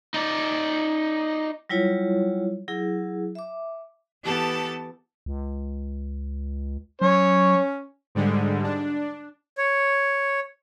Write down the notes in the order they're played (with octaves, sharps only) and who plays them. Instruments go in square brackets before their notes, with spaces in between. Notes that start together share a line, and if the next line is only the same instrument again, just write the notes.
[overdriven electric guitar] D#4 D5
[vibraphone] F#3 G3 E4 F4 C#5
F#3 E4 G#4
E5 D6
[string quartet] E3 B3 G4 A4 A5
[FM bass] C#2
[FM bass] F#3 [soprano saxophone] C#4 [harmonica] C#5
[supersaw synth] G#2 D3 G3 G#3
D4
[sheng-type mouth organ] C#5